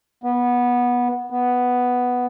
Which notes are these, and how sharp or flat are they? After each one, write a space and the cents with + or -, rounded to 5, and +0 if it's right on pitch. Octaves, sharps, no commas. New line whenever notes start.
B3 -15
B3 +0